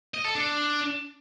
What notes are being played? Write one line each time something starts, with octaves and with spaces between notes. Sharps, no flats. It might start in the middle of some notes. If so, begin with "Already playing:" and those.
D#5
A4
D4